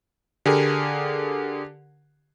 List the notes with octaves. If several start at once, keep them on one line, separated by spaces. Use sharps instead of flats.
D3 G4 G#4 A#4